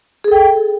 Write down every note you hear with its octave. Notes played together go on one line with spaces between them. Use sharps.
G#4 A4 G5